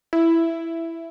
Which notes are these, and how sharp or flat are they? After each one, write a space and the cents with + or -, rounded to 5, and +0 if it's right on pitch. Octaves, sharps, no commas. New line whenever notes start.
E4 +5